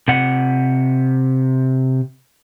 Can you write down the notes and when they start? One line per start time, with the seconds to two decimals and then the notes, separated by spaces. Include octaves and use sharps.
0.08 C3 F#5